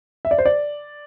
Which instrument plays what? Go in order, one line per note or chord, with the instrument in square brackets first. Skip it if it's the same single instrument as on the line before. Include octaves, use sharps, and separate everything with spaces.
[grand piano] E5
D5
C5
D5